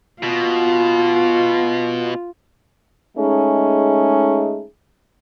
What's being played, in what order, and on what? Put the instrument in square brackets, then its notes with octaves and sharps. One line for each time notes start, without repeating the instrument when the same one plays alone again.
[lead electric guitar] B2 [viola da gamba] F4
[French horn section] G#3 A3 C#4 D#4 G#4